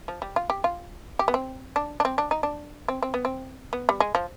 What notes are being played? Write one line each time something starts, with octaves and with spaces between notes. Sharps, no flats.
F3
G3
F4
G4
F4
G4
B3
C4
D4
D4
C4
D4
D#4
D4
C4
C4
B3
C4
B3
G3
G#3
F3